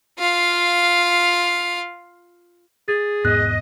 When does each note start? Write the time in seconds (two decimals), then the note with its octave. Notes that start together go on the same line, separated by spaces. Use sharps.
0.19 F4 F5
2.88 G#4 A6
3.25 E1 G#2 B3 D#5 F#6